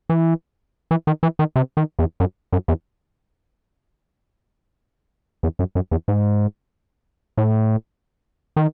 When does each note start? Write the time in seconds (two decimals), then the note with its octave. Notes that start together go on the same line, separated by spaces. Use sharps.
0.09 E3
0.91 E3
1.07 D#3
1.23 E3
1.39 D#3
1.56 C3
1.77 D#3
1.99 E2
2.20 F#2
2.53 F#2
2.68 E2
5.43 E2
5.59 F#2
5.75 F#2
5.91 E2
6.08 G#2
7.37 A2
8.56 D#3